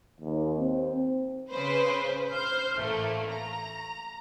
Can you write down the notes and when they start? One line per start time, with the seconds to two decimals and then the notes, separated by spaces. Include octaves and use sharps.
0.20 D#2
0.59 C4
1.50 C#3 B4 C5
2.31 C5 F6 G6
2.77 A1 A3 A#3
3.30 A#5